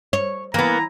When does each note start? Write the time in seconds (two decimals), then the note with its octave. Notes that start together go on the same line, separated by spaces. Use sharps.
0.13 C#5
0.54 E3 A#3 B3 A#5